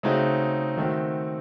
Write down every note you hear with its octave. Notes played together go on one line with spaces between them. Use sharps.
C#3 A3 C4 D#4 F#4
D#3 A3 C4 F#4